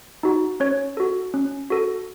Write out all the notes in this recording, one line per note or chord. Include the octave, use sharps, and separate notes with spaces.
D#4 F#4
C#4 C#5
F#4 A4
C#4
F#4 A4